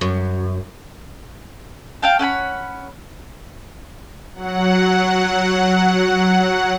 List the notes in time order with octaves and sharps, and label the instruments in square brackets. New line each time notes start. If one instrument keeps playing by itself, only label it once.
[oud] F#2
[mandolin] F5 G5 A5
C#4 F#5 G5 B5
[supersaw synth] F#3 F#5